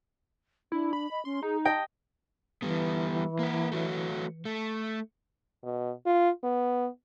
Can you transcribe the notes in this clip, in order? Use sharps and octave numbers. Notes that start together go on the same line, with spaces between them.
D4 E4
B5
D#5
C#4 C6
D#4 G#4
D#5 G5 A5
E3 G3 B3
A#3 B4
A3 F#4 C#5
A3
B2
F4
B3